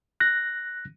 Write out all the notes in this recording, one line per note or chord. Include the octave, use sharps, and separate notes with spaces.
F#6 A#6